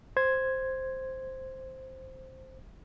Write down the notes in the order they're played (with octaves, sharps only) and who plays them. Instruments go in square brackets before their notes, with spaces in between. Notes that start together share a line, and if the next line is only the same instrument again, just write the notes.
[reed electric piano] C5 G#6